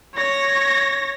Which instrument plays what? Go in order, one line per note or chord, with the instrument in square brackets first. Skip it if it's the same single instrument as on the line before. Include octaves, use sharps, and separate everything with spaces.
[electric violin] C#5 A#6